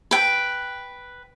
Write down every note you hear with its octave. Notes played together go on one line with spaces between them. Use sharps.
B4 G5